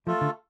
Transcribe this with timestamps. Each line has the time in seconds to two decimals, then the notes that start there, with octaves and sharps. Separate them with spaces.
0.07 F3 A3 F4 A4
0.21 D3